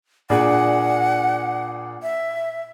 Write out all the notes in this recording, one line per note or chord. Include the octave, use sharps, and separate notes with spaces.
A#2 D4 G#4 F#5
E5